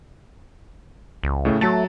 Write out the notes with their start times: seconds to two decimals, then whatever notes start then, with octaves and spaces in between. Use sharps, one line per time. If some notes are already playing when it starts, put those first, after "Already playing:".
1.23 C#2
1.45 A2 C#3 A3
1.61 F#3 A3 A5 A6